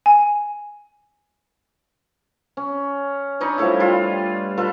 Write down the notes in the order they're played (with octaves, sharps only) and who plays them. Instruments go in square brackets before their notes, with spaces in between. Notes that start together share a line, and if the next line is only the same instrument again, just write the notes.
[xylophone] G#5
[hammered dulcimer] C#4
D4 D#4 B4 C#5
F3 G3 A3 E4
G3 F4
F4 A4 B4